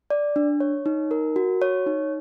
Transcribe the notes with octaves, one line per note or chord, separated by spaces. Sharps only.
D5
D4
C#5
D#4
A#4
F#4
C#5
D#4